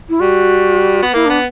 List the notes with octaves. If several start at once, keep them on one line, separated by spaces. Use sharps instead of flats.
E4
G3 F#4
B3
A#3 E4
B3 D4